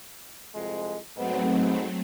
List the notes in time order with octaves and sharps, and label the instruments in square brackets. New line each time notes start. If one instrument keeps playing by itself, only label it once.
[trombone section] C2 F2 G#3
[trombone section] G#2 B3 [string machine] F#3 A3 C4